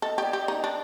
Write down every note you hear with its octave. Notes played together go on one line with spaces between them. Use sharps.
A4 D#5
G4 D5
G4
D#5
D#4
D4